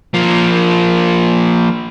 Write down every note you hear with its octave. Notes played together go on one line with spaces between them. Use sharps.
F3 A#3